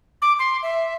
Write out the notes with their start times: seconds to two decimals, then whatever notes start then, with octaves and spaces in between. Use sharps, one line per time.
0.22 D6
0.39 C6
0.63 E5